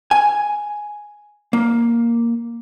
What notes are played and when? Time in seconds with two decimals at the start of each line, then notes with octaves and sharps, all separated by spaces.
0.11 G#5
1.53 A#3